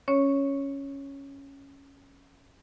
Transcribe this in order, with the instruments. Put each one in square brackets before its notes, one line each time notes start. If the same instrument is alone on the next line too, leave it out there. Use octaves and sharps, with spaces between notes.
[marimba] C#4 C#5